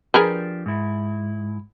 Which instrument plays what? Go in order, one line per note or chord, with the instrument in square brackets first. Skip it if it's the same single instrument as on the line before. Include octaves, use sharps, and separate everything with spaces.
[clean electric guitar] F3 D4 G4 [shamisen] G#4 A#4 B4
[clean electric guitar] G#2 E4